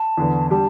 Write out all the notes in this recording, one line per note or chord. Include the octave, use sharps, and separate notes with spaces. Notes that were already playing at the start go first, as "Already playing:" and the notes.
Already playing: A5
E2 D3 B3
G3 D4 G4 A5